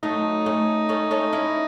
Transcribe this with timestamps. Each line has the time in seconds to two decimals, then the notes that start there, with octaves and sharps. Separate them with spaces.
0.03 F#3 A3 D#4
0.46 A3 C#4
0.89 A3 C#4
1.11 A3 C#4
1.33 C#4 E4